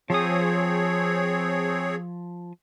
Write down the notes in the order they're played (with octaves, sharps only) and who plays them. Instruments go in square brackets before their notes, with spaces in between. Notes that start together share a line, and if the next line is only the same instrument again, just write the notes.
[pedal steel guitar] F3 D#6 [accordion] C4 G#4 C#5